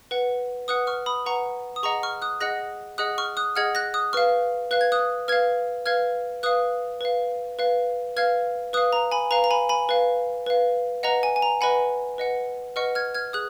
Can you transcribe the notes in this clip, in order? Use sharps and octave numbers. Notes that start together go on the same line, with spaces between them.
B4 F#5
B4 F#5 D#6 F#6
C#6 F6
B5 D#6
B4 F#5 A#5 C#6
D#6
G#4 D#5 F#5 A#5 C#6
C#6 F6
D#6 F#6
G#4 D#5 F#5 F#6 A#6
G#4 D#5 F#5 D#6 F#6
C#6 F6
D#6 F#6
G#4 D#5 F#5 F6 G#6
F#6 A#6
D#6 F#6
B4 F5 C#6 F6
B4 F5 F#6
G#6
D#6 F#6
B4 F5 F6 G#6
B4 F5 F6 G#6
B4 F5 D#6 F#6
B4 F5
B4 F5
B4 F5 F6 G#6
B4 F5 D#6 F#6
A#5
G#5 B5
B4 F5 A#5
A#5
G#5 B5
G#5 B5
B4 F5
B4 F5
B4 D#5 F#5 A#5
G#5
G#5
A#5
B4 D#5 F#5 G#5 B5
B4 D#5 F#5
B4 D#5 F#5 C#6 F6
F6 G#6
F6 G#6
G#4 D#6 F#6